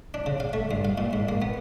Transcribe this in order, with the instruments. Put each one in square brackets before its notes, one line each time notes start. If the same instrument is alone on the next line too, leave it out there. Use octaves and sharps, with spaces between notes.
[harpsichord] D4
C#3
F5
A3
G2
F5
A#2
G#2
A#3
B3